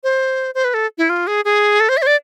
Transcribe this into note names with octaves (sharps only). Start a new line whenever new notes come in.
C5
C5
B4
A4
E4
F4
G#4
G#4
A4
C5
E5
C5
D5